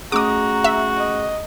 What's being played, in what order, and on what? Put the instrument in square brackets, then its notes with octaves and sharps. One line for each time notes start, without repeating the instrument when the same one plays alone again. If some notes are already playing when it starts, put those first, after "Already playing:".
[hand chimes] A3 C#4 G#4 [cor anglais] F#4 [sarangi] A#5 [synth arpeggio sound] D6 D#6
[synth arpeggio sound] E5
[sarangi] D#5